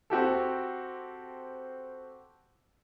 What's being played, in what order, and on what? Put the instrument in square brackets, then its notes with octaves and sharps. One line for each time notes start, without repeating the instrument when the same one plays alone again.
[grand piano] C4 F#4 G4 A4